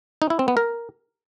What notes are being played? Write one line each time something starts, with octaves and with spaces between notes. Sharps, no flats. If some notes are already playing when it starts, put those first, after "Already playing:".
D#4
E4
C4
B3
A#4